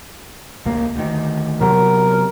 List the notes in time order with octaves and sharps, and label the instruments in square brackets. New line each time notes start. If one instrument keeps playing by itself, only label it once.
[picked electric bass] C#2 A#3
D2 D#3
[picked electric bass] C3 F#3 B3 [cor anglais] A#4